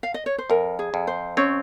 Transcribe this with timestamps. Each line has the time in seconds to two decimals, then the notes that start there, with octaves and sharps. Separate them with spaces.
0.03 F5
0.14 D#5
0.26 C#5
0.38 C5
0.50 F2 A#4
0.79 G#4
0.94 F2
1.07 C5
1.37 C4 C#4 C#5